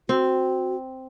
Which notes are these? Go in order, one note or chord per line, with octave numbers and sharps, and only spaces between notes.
C4 F#4